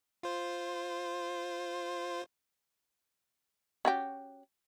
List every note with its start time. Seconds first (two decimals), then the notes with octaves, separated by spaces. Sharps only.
0.23 F4 C5
3.85 C#4 F#4 G4